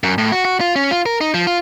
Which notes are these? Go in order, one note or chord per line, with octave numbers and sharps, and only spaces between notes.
F#2
A2
F#4
F#4
F4
C#4
F4
A#4
D#4
F3
F4